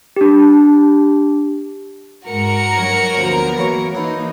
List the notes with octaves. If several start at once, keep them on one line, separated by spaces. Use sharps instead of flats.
D4 G4
G#2 F#4 A#4 A#5 C#7
G2 F#3 C#5
D2 F3 A#3 B3
E3 F#3 C#6
E3 A#3 D#4 E4